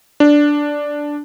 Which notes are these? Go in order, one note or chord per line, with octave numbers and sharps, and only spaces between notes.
D4